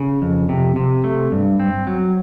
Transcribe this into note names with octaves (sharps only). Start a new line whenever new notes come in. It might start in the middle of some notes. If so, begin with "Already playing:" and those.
Already playing: C#3
F2
C3
C3
A3
G2
C4
F#3